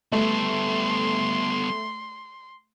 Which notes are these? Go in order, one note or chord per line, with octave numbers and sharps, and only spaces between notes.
G3 A3 B3 C6